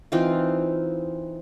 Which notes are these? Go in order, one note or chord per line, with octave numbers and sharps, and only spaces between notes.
E3 C4 D#4 F4